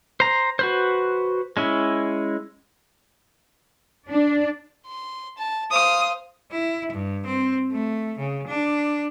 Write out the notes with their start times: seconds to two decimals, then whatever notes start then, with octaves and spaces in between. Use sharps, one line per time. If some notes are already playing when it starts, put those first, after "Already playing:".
0.20 C5 A#5
0.59 F#4 B4 C5
1.57 G#3 C#4 E4
4.08 D4
4.87 C6
5.38 A5
5.71 C5 F5 D#6
6.51 E4
6.93 G2
7.26 C4
7.71 A3
8.18 C#3
8.47 D4